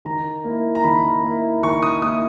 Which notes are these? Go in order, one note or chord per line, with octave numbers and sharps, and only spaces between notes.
D#3 A#5
A#3 E4
A#5
D#3 B5
A#3 E4
D#3 C#6
D#6
A#3 E4 D#6